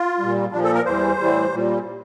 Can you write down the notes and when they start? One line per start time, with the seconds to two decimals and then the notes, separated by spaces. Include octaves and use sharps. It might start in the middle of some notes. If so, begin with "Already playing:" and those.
Already playing: F4
0.19 A#2 G3
0.52 A#2 F3 D4
0.64 A4
0.74 A#4
0.85 E2 E3 G3 C5
1.19 A2 E3 G3
1.53 A#2 G3